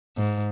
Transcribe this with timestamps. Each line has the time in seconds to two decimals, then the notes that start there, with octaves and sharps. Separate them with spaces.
0.18 G#2